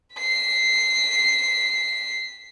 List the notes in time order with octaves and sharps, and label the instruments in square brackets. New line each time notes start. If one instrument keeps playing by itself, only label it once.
[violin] B6 C7